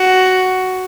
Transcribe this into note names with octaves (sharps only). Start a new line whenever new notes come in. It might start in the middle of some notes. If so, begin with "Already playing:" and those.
Already playing: F#4